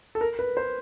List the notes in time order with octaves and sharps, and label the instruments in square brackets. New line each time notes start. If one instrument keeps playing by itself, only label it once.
[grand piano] A4
A#4
B4
C5